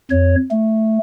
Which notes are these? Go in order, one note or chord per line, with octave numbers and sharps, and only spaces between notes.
F2 C#5
A3